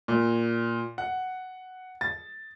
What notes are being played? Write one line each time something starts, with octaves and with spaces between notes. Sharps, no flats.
A#2
F#5
A6